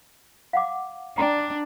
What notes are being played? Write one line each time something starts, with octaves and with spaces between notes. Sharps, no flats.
F5 F#5 D6
D4 G5 A#5